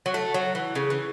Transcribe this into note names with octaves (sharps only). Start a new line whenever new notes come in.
F#3
A3
F#3
E3
C#3
E3